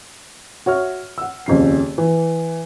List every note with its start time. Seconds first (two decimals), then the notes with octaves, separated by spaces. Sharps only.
0.66 F#4 C#5 E5 F6
1.18 F#5 E6
1.46 D#1 F2 C#3 C7
1.98 E3